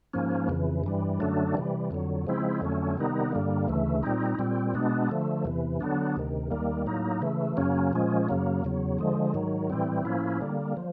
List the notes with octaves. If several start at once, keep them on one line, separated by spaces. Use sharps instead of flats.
G#2 F3 A#3 C#4
F2 C#3 E3
G2 E3 G3
F#2 D3 F#3 A3 D4
C3 E3 G3
F2 D3 F#3
C#3 F3 G#3 C4 E4
F2 D3 F#3 A3 C#4
C3 D#3 G3 B3 D#4
G2 D3 G3 A#3
D2 C#3 E3 A3
A#2 G3 C4 D#4
A#2 G3 C4
B2 G#3 B3 D4
D3 F3 A3
E2 C3 E3
D3 F#3 B3 D4
D2 C3 D#3
D#2 D#3 G3 A#3
A2 F#3 A#3 D#4
C#3 E3 A3
F#2 C#3 F#3 A#3 C#4
A#2 F3 G#3 C#4
F#2 C#3 F#3 A#3
E2 C#3 F#3
D3 F3 G#3
G#2 D#3 F#3
A2 E3 G3 C4
A2 F3 A#3 C#4 E4
D3 G3 A#3
F3